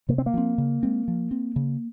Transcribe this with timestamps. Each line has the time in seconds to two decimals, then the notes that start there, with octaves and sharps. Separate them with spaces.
0.09 C3 A#3
0.18 C4
0.26 A#3
0.34 F3 C4
0.58 C#3
0.83 G#3 C4
1.08 F3
1.31 C4
1.56 C#3